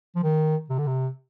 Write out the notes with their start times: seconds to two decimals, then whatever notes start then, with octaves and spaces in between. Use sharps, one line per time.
0.15 F3
0.23 D#3
0.69 C3
0.78 D3
0.87 C3